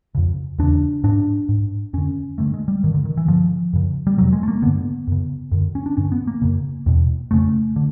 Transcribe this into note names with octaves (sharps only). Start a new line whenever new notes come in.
F2 C#3
E2 C#3 D4
G#2 D4
G#2
F2 D3 C#4
G2 D3 A3
G#3
G3
G2 D3 D#3
D3
D#3
E3
G2 D3 F3
F#2 C#3
G3
F2 C3 F#3
G#3
A3
A#3
G2 D3 B3
F#2 C#3
F#2 D3
C#4
D4
G2 D3 C#4
B3
A#3
F#2 C#3
E2 B2
F2 C#3 A3
D3